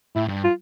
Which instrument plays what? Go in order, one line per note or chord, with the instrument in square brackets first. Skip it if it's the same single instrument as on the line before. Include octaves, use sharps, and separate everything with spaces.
[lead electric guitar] A2 [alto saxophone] E4
[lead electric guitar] G2
[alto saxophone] F4